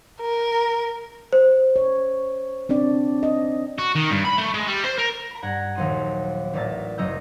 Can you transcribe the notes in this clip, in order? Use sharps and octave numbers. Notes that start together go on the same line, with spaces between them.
A#4
C5
C#5
C4 D4 D5
D#5
F#4
D#3
G2
B5
A3
G#3
G3
C5
A#4
A#5 B5
G2 F#5 A#5 G#6
A#1 D#2 F#3 D#4 C6 D#7
A1 A#4 D5 E5 A5 A6
F#1 F#3 D#5 A#5 E6 G6